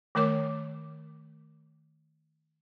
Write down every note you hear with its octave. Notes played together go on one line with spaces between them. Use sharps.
D#3 A3 A#4 C#5 D6